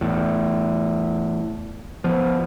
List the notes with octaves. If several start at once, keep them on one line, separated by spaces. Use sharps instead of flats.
E2 A2
F3 B3